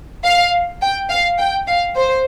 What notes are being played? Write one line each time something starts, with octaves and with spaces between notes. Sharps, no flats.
F5
G5
F5
G5
F5
C5